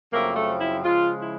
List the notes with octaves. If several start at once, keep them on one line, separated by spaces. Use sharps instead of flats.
F#2 C#3 F3 A3 A#3 C4 A#4
A3 A4
E4
C#3 F3 G#3 F4
E4